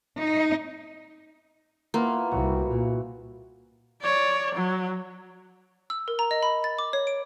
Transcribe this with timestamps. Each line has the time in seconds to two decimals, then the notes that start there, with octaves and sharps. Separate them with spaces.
0.18 D#4
1.94 A#3 B3 E4 F4
2.31 C2 F#4
2.68 A#2
4.01 C#5 D5
4.55 F#3
5.90 E6
6.08 A#4
6.19 A#5
6.31 D#5
6.43 B5
6.64 A6
6.79 D6
6.93 C#5
7.07 D7